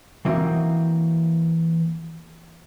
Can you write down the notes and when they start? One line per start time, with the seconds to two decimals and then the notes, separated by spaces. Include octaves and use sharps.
0.25 E3 A#3 C4 F#4 D#5